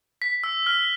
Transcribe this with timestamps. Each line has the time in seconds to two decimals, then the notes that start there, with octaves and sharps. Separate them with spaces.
0.22 B6
0.44 E6
0.66 F6